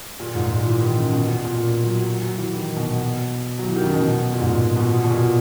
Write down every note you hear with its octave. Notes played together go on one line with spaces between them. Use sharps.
A#2
G#2
A#2
E3
D#3
C#3
B2
A#2
A#2
F#3
F#3
F#3
E3
D#3
B2
F#3
E3
D#3
C#3
B2
A#2
G#2
B2
A#2
B2
A#2